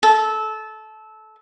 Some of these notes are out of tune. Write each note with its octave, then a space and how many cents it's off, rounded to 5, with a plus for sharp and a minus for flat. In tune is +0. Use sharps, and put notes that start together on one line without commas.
A4 -20